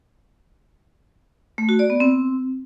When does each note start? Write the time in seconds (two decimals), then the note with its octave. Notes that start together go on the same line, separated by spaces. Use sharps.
1.58 A3
1.69 F#4
1.79 D5
1.90 B3
2.00 C4